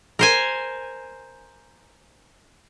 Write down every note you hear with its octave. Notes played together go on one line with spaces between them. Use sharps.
A#4 C5 G#5